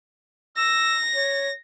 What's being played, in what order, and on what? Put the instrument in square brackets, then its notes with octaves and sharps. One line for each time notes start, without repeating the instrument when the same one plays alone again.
[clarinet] E6 [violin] A#6
[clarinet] C#5